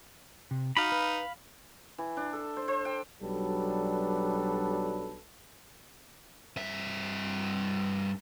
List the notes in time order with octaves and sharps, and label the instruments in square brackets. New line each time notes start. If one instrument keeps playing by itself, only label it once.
[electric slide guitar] C3
[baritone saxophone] D#4 [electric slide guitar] F#4 [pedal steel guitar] F5 B5
[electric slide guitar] B4
[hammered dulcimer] E3
D4
A4
C5
C5
G5
[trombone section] B1 F#3 G3 D4 A4 B4
[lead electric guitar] G2 E5